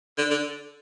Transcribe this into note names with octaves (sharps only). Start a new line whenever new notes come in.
D3
D3